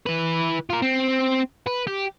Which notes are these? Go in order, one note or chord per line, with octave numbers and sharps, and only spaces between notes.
E3 B4
F4 A#4
C4
B4
G4